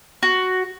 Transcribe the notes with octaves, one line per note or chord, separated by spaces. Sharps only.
F#4